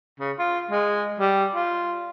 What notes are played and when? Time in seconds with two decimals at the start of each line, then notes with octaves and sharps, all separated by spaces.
0.20 C#3
0.39 F4
0.71 G#3
1.20 G3
1.55 F4